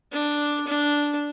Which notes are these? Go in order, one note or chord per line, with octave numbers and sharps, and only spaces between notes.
D4
D4